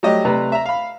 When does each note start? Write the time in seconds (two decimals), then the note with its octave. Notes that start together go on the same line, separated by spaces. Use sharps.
0.03 F#3 G3 A3 G4 D#5
0.25 C3 A3 B4 D5 A#5
0.52 E5 A#5
0.66 F5 B5